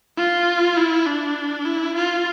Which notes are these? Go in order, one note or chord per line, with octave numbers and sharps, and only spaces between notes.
F4
E4
D4
E4
F4